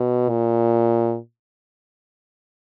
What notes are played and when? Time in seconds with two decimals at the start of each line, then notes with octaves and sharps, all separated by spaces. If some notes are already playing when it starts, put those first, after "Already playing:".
Already playing: B2
0.29 A#2